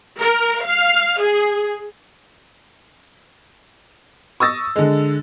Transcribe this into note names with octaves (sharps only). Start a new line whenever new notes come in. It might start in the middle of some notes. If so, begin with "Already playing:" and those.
A#4
F5
G#4
C#6 D#6 E6 A6 A#6
D3 G#3